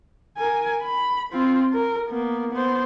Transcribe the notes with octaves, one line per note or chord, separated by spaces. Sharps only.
A#4 G#5
B5
C4 F4
A#4
A#3 B3
B3 C5